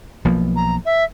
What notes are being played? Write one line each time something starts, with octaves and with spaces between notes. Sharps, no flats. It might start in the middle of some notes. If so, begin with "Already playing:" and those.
B1 F3 A#3
A#5
E5